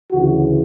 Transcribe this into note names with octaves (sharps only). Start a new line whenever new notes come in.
D2 C#3 E3 F#4